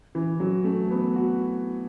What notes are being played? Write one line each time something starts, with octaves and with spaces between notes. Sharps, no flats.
E3
F#3
A3
B3
F#4